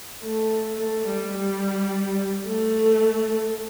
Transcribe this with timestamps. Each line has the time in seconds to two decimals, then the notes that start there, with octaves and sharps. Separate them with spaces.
0.21 A3
0.78 A3
1.06 G3
1.34 G3
2.46 A3